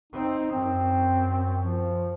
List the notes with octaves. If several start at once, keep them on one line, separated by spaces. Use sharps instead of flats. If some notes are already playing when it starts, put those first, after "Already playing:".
C4 D#4
F#2 C4
F3